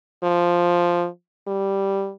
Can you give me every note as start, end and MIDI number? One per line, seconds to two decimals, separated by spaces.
0.24 1.07 53
1.47 2.12 55